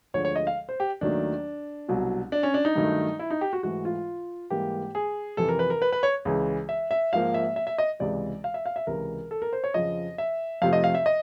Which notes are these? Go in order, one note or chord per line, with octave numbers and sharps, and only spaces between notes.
D2 D3 F3 G#3 C#5
C#5
D#5
F5
C5
G4
D#2 D#3 F#3 A3 D4
C2 B2 F#3
D4
C#4
D4
D#4
G2 D#3 F#3 A3
E4
D#4
G4
F#4
G#2 E3 A3 F#4
F4
G#2 E3 G3 A#3 G4
G#4
F2 C3 E3 A4
A#4
B4
A#4
B4
B4
C#5
C#2 C#3 E3 G#3
E5
E5
G#2 F3 A#3 F5
E5
E5
E5
D#5
C#2 C3 E3 G#3 D5
F5
E5
F5
E5
C#2 C3 E3 A#4
A4
A#4
C5
C#5
F2 C#3 F3 D#5
E5
F2 C3 F3 A3 F5
D#5
F5
E5
D#5